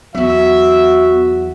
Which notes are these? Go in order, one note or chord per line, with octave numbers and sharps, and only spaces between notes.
E2 F#3 B3 F#4 E5